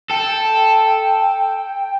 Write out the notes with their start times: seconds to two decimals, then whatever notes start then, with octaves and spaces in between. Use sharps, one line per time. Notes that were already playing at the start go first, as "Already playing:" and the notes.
0.11 A4 G5